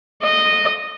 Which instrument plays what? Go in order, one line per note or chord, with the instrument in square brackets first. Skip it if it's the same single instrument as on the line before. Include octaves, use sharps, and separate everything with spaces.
[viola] D#5